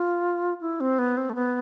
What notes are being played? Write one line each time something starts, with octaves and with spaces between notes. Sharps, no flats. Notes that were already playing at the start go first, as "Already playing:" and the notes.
Already playing: F4
E4
C4
B3
C4
A3
B3